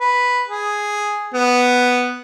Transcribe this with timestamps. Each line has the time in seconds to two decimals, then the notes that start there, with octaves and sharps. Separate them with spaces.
0.01 B4
0.48 G#4
1.34 B3